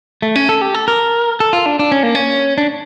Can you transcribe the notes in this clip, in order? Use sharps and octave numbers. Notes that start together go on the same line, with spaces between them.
A3
C#4
A4
G4
A4
A#4
A4
F4
D4
D4
C#4
A#3
C#4
D4